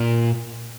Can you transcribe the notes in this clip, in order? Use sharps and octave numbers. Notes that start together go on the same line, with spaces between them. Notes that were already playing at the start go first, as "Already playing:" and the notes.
Already playing: A#2